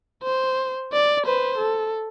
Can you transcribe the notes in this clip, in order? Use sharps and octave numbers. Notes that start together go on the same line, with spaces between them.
C5
D5
B4 C5
A4